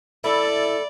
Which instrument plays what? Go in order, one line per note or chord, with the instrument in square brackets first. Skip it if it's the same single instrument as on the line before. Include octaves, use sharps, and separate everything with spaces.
[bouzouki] E4 [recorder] A4 [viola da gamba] D5